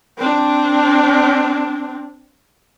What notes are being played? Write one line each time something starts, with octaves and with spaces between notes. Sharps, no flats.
C4 D4